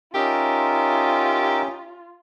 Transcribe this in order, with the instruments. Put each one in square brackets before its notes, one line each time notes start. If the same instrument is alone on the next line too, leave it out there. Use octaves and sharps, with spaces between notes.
[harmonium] C#4 [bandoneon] D#4 A#4 E5 [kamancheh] F4 [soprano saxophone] G4